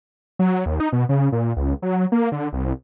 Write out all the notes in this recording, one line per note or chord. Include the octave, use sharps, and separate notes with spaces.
F#3
D#2
D#4
B2
C#3
A#2
C#2
F#3
A#3
D3
C2